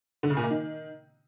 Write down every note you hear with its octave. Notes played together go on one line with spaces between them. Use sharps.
D3
C#3
A#2
A#3
D#3